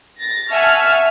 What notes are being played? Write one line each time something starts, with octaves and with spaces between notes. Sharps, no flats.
A6 A#6
E5 F#5 G#5 A5 C#6 F6